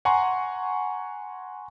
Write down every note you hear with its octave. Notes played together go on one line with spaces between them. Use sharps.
F#5 G#5 A#5 C6 C#6